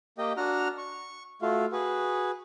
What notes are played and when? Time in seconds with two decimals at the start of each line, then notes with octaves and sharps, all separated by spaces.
0.18 A#3 G4 D#5 G5
0.37 D4 F#4 F#5 A#5 F6
0.78 C#6
1.42 A3 F4 F#4 F5
1.72 F#4 G#4 B4